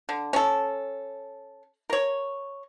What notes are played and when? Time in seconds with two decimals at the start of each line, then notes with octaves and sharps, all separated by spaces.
0.09 D3
0.33 C#4 A4
1.90 A#4 C#5